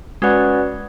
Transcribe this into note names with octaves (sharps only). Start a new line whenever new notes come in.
G#3 C#4 F#4 B4 D5 F#5